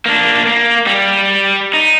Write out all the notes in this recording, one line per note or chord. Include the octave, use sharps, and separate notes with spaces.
A#3 D4
A#3
G3
D#4